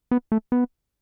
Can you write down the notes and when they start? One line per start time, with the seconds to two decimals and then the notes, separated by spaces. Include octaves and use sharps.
0.11 B3
0.32 A3
0.52 B3